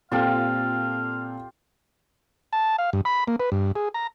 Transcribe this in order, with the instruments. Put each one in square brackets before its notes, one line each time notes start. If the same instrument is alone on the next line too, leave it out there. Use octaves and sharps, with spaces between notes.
[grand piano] A#2 C4 A4 [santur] F4 G4 [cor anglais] F5
[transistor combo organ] A5
F5
G2
B5
A#3
B4
G2
G#4
A#5